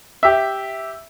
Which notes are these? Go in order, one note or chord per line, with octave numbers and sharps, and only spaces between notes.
G4 E5